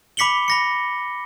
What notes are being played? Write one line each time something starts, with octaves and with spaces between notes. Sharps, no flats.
B5 D6 B6 C#7 F#7 G7
B5 A#6 C#7